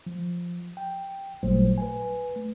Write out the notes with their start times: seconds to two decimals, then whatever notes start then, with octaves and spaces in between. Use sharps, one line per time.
0.06 F3
0.77 G5
1.43 A1 A#2 F#3 G3 A3 C5
1.78 B4 G#5
2.36 A3